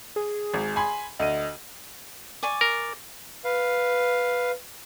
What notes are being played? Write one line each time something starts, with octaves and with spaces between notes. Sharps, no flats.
G#4
G#1
G#5 B5 C6
D2 D#5 D#7
D5 G#5 C#6
A#4
B4 F5